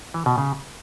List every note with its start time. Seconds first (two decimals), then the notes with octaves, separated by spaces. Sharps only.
0.14 E3
0.26 B2
0.38 C#3